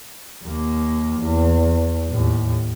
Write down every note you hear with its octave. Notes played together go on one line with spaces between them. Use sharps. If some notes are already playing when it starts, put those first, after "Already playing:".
D#2 A#3
E2
D#2 A2